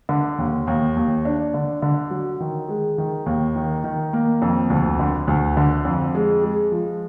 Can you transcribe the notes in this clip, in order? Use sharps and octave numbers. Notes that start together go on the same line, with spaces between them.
D3
D#2
D#2
D#2
D4
D3
D3
F#3
D#3
G#3
D#3
D#2
D#3
D#3
A#3
F2
D2
D3
D2
D3
F2
G#3
G#3
F3